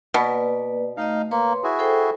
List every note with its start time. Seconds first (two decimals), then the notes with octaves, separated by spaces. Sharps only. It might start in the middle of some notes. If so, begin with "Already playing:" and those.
0.14 B2 A#3 B4 D5
0.97 A3 D#4 D#5 F5
1.31 A#3 B4 C#5 C6
1.64 E4 F#4 G#4
1.79 A4 C5 G5